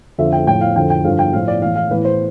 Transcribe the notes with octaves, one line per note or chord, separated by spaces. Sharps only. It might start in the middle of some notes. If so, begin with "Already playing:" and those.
F2 D3 F3 E5
G5
A2 F3 G5
F5
F2 D3 F3 G5
G5
G2 D3 F3 F5
G5
A2 F3 F5
D5
A2 E3 F5
F5
A2 E3 B4
C5